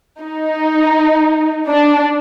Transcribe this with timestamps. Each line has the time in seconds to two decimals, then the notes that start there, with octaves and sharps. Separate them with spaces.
0.21 D#4
1.68 D4